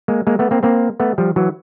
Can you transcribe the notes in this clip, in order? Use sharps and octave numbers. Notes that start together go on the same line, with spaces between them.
G#3 A#3
G#3 A#3
A3 B3
A#3 C4
A#3 C4
A3 B3
F3 G3
E3 F#3